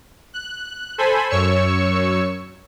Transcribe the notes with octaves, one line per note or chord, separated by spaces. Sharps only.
F#6
A4 C5 G#5 B5
F#2 C#5 C#6 E6 C#7